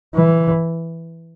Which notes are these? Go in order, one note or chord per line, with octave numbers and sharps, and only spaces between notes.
E3